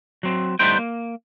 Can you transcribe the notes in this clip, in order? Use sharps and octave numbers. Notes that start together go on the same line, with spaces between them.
F#3 C4
A2 G3 B3 D#4 C5 G5
A#3